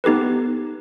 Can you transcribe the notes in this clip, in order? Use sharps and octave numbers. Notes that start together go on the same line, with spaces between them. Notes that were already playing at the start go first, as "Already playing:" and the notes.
B3 D#4 G4 A4 B4